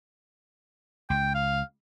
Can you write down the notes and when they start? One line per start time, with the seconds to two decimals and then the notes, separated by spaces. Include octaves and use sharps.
1.10 C#2 G5
1.34 F5